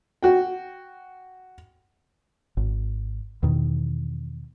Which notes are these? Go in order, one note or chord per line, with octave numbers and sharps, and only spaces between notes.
F#4 G5
G#1
E2 B2 D#3